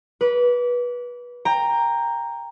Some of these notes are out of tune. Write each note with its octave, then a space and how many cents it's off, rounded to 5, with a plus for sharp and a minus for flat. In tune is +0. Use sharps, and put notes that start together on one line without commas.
B4 -20 D6 -30
G5 +20 A#5 +0